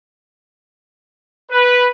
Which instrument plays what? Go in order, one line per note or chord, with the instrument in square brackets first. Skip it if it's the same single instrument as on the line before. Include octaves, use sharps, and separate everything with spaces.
[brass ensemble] B4